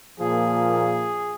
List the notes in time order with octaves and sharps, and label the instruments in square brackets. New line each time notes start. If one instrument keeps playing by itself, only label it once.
[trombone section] A#2 F3 A#3 G#4